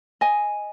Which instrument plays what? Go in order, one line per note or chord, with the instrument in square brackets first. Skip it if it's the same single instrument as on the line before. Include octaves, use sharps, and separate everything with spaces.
[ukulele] D#5 G#5